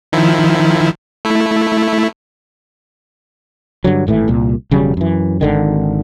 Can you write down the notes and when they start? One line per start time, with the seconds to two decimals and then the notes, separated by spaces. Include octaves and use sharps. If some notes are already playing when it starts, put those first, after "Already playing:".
0.13 D#3 F3 E4
1.25 A3 E4
3.84 G2 D3 F#3
4.07 G#1 A2 E3 A3
4.28 C2 A#2
4.71 E1 C#3 F#3 G3
4.97 F#2 E3
5.41 G#1 D3 D#3